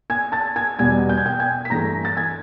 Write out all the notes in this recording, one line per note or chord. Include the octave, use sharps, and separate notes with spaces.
G#5 G#6
A5 A6
G#5 G#6
E2 B2 G3 G#5 G#6
G6
G#6
G5 G6
G#5 G#6
B6
G2 E3 A3 A#5 A#6
A6
G#5 G#6